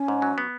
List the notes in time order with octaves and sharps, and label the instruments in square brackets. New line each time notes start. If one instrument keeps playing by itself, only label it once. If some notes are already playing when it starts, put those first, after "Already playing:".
Already playing: [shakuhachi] C#4
[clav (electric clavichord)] G#2
F#3
B3